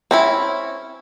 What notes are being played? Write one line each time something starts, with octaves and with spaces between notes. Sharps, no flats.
C4 C#4 E4